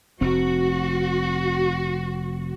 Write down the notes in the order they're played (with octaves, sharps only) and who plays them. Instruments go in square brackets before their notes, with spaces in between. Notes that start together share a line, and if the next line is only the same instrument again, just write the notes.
[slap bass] F1 C4 [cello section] F#4